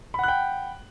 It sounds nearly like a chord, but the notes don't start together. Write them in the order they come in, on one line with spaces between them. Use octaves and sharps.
B5 F#5 F#6 G5